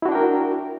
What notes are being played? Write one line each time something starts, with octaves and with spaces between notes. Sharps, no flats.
D4 E4 F#4 A#4 G5